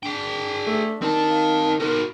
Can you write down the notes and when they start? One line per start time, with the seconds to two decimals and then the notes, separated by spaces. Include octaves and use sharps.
0.03 D4 G#4 G5
0.67 A3
1.02 D#3 C4 A5
1.29 F5
1.80 B3 D#4 F#4 A#4